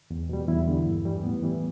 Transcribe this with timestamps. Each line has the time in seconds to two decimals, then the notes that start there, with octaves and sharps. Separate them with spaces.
0.11 E2
0.29 B2 G3
0.48 E2 E4
0.67 D3 G3
0.86 G2
1.05 E3 G3
1.23 A2 B3
1.43 E3 G3